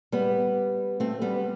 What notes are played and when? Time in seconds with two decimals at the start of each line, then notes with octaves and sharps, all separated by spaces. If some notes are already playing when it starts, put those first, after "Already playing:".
0.12 G3 B3
1.00 A3 C4
1.22 G3 B3